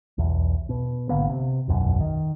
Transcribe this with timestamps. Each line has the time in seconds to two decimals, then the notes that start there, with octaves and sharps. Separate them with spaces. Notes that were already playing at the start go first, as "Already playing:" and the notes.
0.18 B1 E2
0.69 B2
1.09 G#1 D3 A#3 B3
1.29 C3
1.68 E1 B1 F#2
2.01 D#3